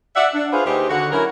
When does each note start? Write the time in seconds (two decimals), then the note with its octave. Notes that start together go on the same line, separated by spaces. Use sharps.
0.16 D5 E5 F#5
0.34 D4
0.52 F4 G#4 B4 C5 F5
0.66 D#2 D#4 G4 G#4 B4 C5
0.90 D3 F#4 F#5
1.12 F#3 C#4 E4 A#4